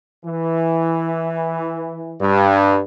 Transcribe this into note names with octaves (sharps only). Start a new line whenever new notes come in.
E3
G2